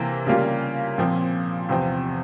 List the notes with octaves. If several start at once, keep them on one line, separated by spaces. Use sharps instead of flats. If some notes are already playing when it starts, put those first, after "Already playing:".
Already playing: C3 E3 A#3
C#3 G3 A#3 F4
A#2 F3 C4
E2 C3 F3 C4